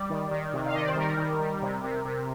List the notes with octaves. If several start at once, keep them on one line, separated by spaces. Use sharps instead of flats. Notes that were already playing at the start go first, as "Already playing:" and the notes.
Already playing: G3 D5
D#3
D#3
C3
F5
D#3 D#5
D5
C5
G3 A#4
D#3
G3
C3
C3
C3